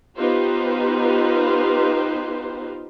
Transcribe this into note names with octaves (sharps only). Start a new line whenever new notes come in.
B3 D#4 F4 G4 B4 C5